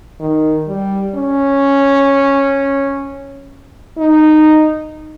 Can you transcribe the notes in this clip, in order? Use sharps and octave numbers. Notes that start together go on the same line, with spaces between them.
D#3
G3
C#4
D#4